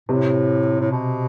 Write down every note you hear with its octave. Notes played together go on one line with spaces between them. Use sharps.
A2 C3
A2
B2